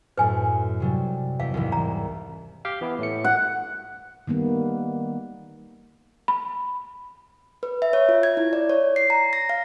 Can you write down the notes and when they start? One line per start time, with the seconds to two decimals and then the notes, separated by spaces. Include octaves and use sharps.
0.17 F#2 A2 B4 G#5
0.80 C3 F#3 G3
1.40 E2 F5
1.54 C2 G#2 E3
1.72 A#5
2.65 G4 F5 G5
2.81 E3 B3 E4
2.99 A2 A3 C#7
3.24 F#5
4.27 D#3 G3 A#3 B3
6.28 B5
7.63 B4
7.82 E5
7.93 C#5
8.09 F4
8.23 G#6
8.37 E4
8.53 D5
8.70 C#5
8.96 C7
9.10 A#5
9.33 A#6
9.49 F5